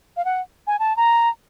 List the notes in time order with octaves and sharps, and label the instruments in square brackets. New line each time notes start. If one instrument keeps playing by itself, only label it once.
[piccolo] F5
F#5
G#5
A5
A#5